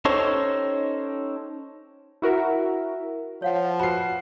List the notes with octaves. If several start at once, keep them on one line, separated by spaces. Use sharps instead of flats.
C#4 D#4 G4 A4 C5 C#5
E4 F#4 A#4 E5
F3 C#5 F5 F#5
F#4 B4 B5 C7